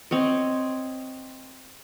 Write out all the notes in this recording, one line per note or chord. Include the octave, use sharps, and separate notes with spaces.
C4 C#5 D#5